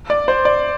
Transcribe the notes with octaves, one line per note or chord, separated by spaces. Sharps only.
D5
C5
D5